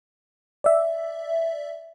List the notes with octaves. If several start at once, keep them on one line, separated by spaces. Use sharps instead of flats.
D5 E5